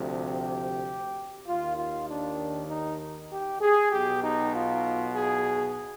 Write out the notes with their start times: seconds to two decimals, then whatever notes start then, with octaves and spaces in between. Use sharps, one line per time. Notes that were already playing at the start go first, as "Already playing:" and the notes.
Already playing: D2 C3 F3
0.24 G4
1.47 D#2 D#3 F4
1.78 F4
2.08 D4
2.69 D#4
3.30 G4
3.61 G#4
3.92 B1 B2 G4
4.23 D#4
4.54 F4
5.14 G#4